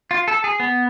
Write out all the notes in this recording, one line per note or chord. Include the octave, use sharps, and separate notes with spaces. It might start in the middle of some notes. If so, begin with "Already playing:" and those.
F4
A4
G#4
B3